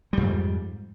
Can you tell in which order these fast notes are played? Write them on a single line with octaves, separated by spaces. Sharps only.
G3 F2 G#2